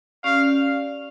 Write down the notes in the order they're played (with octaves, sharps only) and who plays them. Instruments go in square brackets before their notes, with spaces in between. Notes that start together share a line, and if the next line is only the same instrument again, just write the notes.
[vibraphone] C#4 G4 D5 [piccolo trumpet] F5